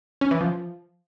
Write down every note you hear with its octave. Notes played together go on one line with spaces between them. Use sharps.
C#4
E3
F3